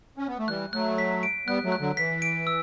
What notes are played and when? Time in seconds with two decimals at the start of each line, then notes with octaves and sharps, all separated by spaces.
0.17 C#4
0.28 B3
0.39 A3
0.48 E3 G3 F#6
0.73 F#3 A3 F#6
0.98 B6
1.23 D7
1.47 G3 B3 F#6
1.64 F#3 A3
1.72 F#6
1.80 D3 F#3
1.97 E3 B6
2.22 D7
2.47 E6